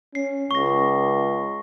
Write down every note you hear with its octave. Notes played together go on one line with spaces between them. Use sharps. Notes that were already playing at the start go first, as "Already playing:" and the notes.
C#4 C7
C#2 C#6 A#6